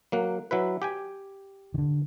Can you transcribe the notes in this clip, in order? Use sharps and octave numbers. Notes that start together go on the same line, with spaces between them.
F#3 A#3 F#5
F#3 E4 B4
G4 G5 G#5
D3 D#3